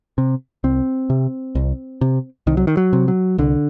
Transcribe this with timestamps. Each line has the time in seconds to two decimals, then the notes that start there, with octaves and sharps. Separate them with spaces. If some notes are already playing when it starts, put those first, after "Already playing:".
0.18 C3
0.64 C2 C4
1.10 C3
1.55 C2
2.01 C3
2.47 C2 D#3
2.57 F#3
2.67 D#3
2.77 F#3
2.93 C3
3.08 F#3
3.38 C2 D3